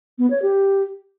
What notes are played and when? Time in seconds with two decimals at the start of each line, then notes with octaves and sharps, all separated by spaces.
0.19 B3
0.30 C#5
0.42 G4